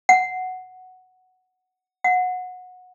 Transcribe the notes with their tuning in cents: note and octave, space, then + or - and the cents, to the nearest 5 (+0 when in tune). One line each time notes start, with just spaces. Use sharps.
F#5 +0
F#5 -20